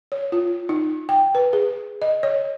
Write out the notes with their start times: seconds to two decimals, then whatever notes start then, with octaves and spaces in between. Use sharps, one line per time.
0.12 C#5
0.32 F4
0.69 D#4
1.09 G5
1.35 B4
1.53 G#4
2.02 D#5
2.23 C#5